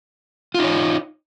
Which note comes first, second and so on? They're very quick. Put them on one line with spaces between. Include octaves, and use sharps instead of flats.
F4 D#4 C#5